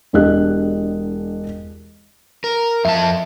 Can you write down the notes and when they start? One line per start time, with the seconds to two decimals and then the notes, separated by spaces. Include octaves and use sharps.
0.13 E1 D4 G4 G#4 D#5 F#6
2.44 A#4
2.85 F2 E5 A5